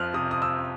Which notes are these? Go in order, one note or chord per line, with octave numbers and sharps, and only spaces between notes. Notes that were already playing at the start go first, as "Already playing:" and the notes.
Already playing: F2 F3 F6 F#6
C3 D#6
D#6
E6